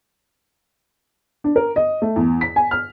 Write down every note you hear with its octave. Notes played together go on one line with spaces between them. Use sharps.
D4
A#4
D#5
A3
E2
B6
G#5
F6